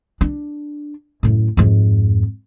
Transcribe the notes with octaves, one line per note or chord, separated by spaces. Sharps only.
D4
F#2 A2
F2 G#2